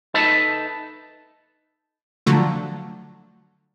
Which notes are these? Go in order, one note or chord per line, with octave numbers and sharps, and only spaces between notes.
D#4 A4 B4 E5 A5
D3 F3 F#3 A3